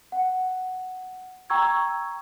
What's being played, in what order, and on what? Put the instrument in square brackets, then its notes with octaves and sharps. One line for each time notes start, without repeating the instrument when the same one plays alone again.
[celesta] F#5
G5 A#5 C#6 E6 G#6